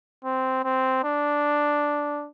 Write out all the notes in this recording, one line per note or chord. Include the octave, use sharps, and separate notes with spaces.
C4
C4
D4